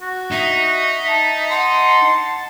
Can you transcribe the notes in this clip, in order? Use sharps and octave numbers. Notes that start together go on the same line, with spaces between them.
F#4
D#4 E5
A5
F#5 C6